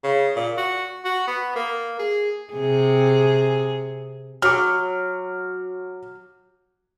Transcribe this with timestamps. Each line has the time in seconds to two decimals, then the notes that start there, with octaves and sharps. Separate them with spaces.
0.04 C#3
0.36 A#2
0.57 F#4
1.05 F#4
1.28 B3
1.56 A#3
1.99 G#4
2.53 C3 G#4
4.42 F#3 D6 F6